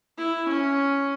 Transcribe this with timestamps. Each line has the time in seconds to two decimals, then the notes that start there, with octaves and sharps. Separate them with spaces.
0.18 E4
0.48 C#4